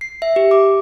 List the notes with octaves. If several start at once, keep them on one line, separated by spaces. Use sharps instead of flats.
C7
E5
G4
D6